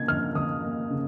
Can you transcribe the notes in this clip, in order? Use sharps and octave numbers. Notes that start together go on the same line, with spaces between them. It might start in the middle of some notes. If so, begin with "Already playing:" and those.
Already playing: C#3 A#3 G#6
F2 F6
F2 D#6
A#3
C#3